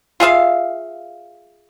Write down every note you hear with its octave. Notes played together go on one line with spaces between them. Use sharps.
F4 G#4 E5 F5